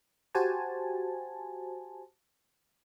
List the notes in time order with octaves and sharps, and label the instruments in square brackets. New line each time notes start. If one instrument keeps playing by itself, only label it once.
[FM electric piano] F#4 G4 C5 G#5 A5